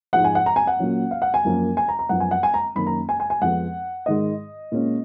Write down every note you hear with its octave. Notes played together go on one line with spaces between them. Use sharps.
G#2 F3 G#3 F#5
G#5
F#5
A#5
G#5
F#5
A#2 F#3 C#4
F5
F#5
G#5
F#2 F3 A#3 C#4
G#5
A#5
A#5
F#2 F3 B3 F#5
G#5
F#5
G#5
A#5
F#2 D#3 A#3 C#4 B5
A#5
G#5
G#5
G#5
F2 F3 G#3 B3 F#5
G#2 D#3 G#3 D#5
A#2 G#3 C#4